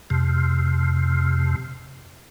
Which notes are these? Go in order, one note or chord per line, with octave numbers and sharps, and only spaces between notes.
F2 C3